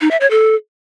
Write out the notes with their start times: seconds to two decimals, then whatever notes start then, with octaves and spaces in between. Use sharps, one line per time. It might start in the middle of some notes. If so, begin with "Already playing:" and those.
0.01 D#4
0.11 E5
0.21 C#5
0.30 A4